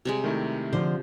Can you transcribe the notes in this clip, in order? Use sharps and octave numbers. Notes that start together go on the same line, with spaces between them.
C3 G3 G#3
D#3 A3 E4
D3 F3 C5